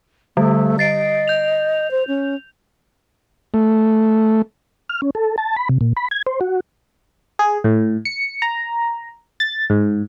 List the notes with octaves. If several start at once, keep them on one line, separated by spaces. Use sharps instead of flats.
D3 G3 A3
D#5 A6 C7 D7
G6 F7
C5
C#4
A3
F6
C#4
A4
A5
B5
C3
A#2
B5
G#6
C5
F#4
G#4
A2
C#7
A#5
A6
G#2